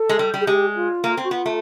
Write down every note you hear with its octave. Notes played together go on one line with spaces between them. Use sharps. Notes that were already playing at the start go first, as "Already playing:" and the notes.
Already playing: A4
G#3
G3
G3
G#4
G#3 G4
F4
A#3
C4
F#4
B3 F4
A3